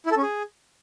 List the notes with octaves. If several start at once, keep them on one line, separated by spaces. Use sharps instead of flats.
E4
A4
C#4
G#4